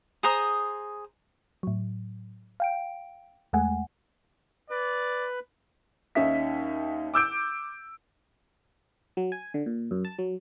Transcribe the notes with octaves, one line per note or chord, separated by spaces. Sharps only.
G#4 C5 A#5 D#6
A2 F#3
F5 G5 D7
E2 G#3 A3 F#5 G#5
B4 D5
D#2 C#4 D#4 E5 B6
D6 E6 G6 D7
F#3
G#5
D3
A#2
F#2
A5
F#3